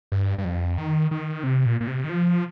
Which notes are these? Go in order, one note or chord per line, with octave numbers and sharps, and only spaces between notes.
G2
G2
F2
D#3
D#3
C3
A#2
A#2
C3
D#3
F3